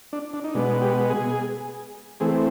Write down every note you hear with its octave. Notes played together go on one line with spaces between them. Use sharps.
D4
D4
D#4
B2 G#3 B3 D4
G4
G#4
E3 A3 C4 G#4